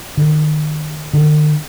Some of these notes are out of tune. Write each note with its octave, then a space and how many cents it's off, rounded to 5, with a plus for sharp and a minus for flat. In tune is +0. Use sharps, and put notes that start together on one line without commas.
D#3 -30
D#3 -45